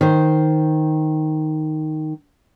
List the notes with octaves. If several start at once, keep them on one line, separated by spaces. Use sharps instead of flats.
D#3 C5